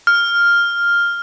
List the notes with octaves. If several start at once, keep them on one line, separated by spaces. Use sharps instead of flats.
F6